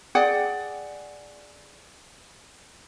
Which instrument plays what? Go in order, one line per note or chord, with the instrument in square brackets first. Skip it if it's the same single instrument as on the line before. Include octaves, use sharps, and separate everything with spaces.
[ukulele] G#4 D5 F#5 G5